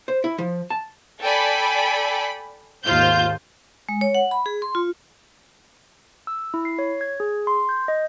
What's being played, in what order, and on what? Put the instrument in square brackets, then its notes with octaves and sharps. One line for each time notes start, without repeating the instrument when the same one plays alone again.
[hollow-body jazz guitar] C5
E4
F3
A5
[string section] A4 D5 G5 G#5 B5
D#2 G#2 F4 C5 G6
[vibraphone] G#3
C#5
F#5
B5
G#4
C6
F4
[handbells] E6
E4
C7
C#5
G#6
G#4
C6
G6
D#5